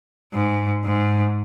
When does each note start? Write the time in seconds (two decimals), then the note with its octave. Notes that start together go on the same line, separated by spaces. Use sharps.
0.33 G#2
0.85 G#2